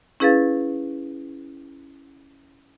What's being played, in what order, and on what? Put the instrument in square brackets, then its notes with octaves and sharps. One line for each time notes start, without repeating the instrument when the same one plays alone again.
[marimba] C#4 E4 G#4 B4 F5 A6